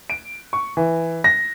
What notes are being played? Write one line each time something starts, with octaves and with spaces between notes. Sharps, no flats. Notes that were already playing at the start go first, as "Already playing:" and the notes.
D7
C#6
E3
A#6